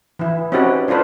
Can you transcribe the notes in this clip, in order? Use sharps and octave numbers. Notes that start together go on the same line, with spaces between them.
E3 E4
C4 C#4 D#4 F#4 G4 B4
D4 F4 A4 B4 C5